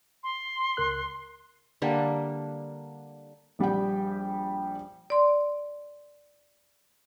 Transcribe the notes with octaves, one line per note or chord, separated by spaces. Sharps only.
C6
C#2 A#4 F#6
D3 G3 A#3 D4
A#1 G3 G4 G5
D5 C6